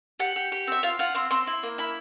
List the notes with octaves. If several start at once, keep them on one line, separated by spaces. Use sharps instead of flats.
G4 F#5
G4
G4
C4 E5
F4 F5
F4 F#5
C4 C6
C4 C6
E4
A#3
E4 B5